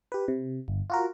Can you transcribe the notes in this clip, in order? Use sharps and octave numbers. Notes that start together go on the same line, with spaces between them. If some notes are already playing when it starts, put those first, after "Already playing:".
G4 B4
C3
G1
F4 F#4 A#4